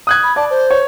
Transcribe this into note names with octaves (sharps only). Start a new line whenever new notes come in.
D#6 F#6 G#6
B5
D5 A5
C5
C#5